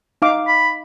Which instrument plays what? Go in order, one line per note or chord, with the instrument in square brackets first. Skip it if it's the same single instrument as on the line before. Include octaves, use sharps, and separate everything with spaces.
[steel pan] D#4 F5 D6
[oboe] B5